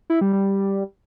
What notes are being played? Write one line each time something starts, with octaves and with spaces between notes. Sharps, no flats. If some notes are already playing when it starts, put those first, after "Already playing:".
E4
G3
G3